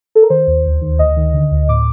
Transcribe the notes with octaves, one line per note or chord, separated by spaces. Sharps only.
A4
A#4
D#3 C5
D#2
D2
D#3
D2 D#5
D#3
D3
D2
A2 D6